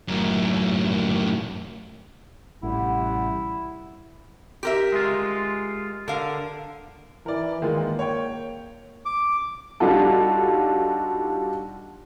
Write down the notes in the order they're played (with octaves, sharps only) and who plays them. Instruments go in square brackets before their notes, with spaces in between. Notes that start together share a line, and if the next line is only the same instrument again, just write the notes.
[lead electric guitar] F#2 A2
[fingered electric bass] A1 [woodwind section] A2 C3 G3 [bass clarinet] E4 [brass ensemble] F#5
[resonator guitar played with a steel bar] G4 A#4 E5
[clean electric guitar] G#3 F4
[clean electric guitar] D3 [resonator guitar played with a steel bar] A#4 F5
[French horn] E3 [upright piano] A#4 D5
[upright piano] D#3 G#3 F4 [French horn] A#3
[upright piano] C#5 G5
[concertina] D6
[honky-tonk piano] G3 D4 D#4 F4 F#4 A4